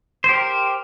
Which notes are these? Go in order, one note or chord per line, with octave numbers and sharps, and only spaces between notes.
G4 A#4 C5